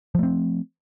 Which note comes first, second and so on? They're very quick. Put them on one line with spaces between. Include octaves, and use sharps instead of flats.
F3 A3 C4